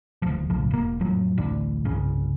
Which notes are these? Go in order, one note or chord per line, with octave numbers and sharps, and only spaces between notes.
D#1 D2 F3
B1 A2 C#3 F3
E1 A#3
F2 A2 F3 F#3
A1 D2 D4
G1 C2 C#3